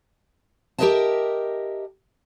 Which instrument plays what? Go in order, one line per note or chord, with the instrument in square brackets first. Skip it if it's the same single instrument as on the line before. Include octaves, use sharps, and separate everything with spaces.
[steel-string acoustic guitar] G4 A#4 C5 D#5 E5 A5